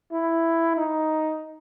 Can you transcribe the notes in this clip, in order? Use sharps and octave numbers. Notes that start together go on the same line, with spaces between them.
E4
D#4